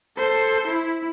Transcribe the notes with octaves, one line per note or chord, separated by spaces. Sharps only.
A4 C5
E4